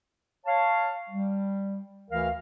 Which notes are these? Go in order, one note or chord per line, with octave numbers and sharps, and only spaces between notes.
C#5 F5 A5
G3
D2 E3 A#4 F5